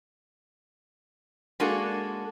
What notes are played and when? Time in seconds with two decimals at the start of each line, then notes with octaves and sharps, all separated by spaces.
1.60 G#3 A#3 D4 F#4 A4